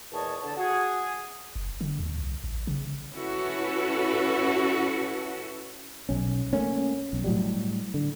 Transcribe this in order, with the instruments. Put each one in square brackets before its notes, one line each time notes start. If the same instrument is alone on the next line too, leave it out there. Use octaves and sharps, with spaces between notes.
[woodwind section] E2 A#2 C#5 D#5 A5
D3 A5
F#4 G#4
[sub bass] F#1
D3
D#2
C2
A1
C#3
[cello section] C#4 E4 F#4 A4 B4
[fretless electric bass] B1 C#4
A3 A#3 C#4
B1
A2 F#3 G3
D3